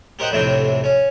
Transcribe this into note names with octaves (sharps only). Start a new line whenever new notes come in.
G4 A#4 C5 D#5 F#5 G5
B1 F2 A2 C3 D4 G5
C#4